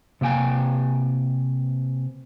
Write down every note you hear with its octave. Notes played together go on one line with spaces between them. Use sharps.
C3 A#3 G5 G#5